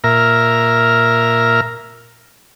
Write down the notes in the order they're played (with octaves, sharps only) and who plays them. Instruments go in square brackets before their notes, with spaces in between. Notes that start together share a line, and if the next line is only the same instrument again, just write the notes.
[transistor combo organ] A#2 A#4 E5 A#5 F6